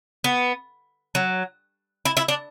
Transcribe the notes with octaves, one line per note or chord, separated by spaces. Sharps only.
B3
F#3
E4
E4
D4